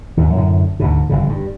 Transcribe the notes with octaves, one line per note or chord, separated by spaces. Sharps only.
D#2 G#2
F#2 A2 D3
D2 G#2 B2
G1 F2 C#3
G2